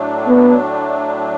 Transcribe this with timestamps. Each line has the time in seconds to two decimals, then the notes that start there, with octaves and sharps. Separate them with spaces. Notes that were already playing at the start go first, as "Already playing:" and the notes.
Already playing: A2 F#3 A3 D4
0.27 B3